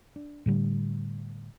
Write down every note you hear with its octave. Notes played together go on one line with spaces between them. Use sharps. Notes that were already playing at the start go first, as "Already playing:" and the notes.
D4
A2 D3 G3